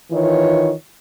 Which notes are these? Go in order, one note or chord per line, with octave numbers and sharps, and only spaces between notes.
D#3 E3 F4 C#5